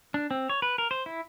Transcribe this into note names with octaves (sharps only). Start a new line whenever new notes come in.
D4
C4
C#5
B4
A#4
C5
E4